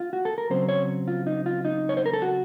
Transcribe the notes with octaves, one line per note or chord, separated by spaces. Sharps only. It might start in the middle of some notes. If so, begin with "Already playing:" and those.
F4
F#4
A4
A#4
C#3 F#3 C4 C5
C#5
F4
D#4
F4
D#4
C#5
C5
A#4
A4
F#4